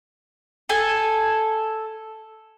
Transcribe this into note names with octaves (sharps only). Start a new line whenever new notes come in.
A4 G#5